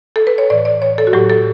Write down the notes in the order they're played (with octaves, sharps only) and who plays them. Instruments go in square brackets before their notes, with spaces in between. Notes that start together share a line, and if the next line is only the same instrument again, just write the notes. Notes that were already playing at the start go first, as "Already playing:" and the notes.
[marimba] A4
B4
C#5
A2 E3 D5
D5
C#5
A4
F#4
A2 F#3 G4
A4